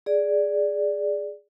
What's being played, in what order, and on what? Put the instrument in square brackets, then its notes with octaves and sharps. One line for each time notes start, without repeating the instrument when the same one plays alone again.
[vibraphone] G#4 D5